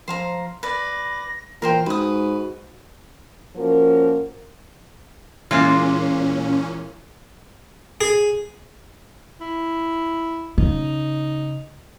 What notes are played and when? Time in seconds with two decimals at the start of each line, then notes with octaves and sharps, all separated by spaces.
0.08 F3 C5 F5 A#5
0.63 B4 D5 A#6
1.62 A#2 E3 A#4 C5 G5
1.86 G#2 F#4 B4 D#6
3.56 F3 A#3 C#4 F#4 A#4
5.51 A#2 E3 G#3 A#3 C#4 F4
8.01 G#4
9.41 E4
10.58 C#3 D#4